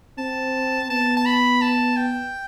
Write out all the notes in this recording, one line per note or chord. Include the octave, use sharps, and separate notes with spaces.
C4 A5
B3 A5
A5
B5
A5
G5